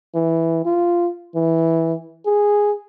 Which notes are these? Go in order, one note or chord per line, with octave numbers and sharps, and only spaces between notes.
E3
F4
E3
G#4